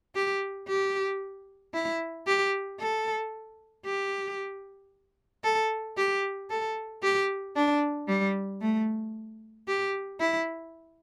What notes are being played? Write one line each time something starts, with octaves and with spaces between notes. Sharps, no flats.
G4
G4
E4
G4
A4
G4
A4
G4
A4
G4
D4
G3
A3
G4
E4